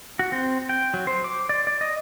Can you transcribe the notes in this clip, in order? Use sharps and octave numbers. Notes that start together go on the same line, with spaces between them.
F#4
C4
G5
F#3
C5
D6
D5
D5
D#5